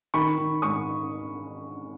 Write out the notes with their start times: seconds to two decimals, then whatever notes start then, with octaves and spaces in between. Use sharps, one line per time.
0.14 D#3 B5 C#6
0.38 D#3
0.62 G#2 C#6 D#6